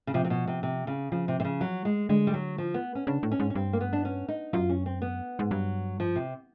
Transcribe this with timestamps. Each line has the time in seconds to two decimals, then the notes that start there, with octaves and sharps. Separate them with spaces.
0.07 C#3
0.14 C3 F3
0.24 C3
0.30 B2
0.47 C3
0.63 C3
0.87 C#3
1.12 C#3 F3
1.28 C3
1.40 C3
1.45 C#3
1.61 F#3
1.85 G#3
2.09 D3 G#3
2.27 G3
2.34 F#3
2.58 F3
2.74 B3
2.95 C#4
3.07 C#3 D4
3.23 A2
3.31 C#4
3.40 G#2
3.50 C#4
3.55 G2 C4
3.73 A#3
3.81 B3
3.93 D4
4.05 C#4
4.28 D#4
4.53 F#2 F4
4.70 C#4
4.86 C4
5.02 B3
5.39 G#2
5.51 G2 F#3
6.00 F3
6.16 C3